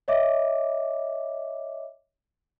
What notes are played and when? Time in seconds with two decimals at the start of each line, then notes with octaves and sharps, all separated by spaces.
0.08 C#5 D#5 E5 D6